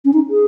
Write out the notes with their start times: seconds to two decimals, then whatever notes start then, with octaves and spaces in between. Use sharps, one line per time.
0.05 C#4
0.13 D#4
0.30 G#4